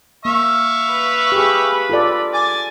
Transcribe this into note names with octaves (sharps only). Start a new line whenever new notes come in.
A#3 E5 F5 C#6
B4 B5
G4 G#4
F4 A4 D5
G#5 D6 A6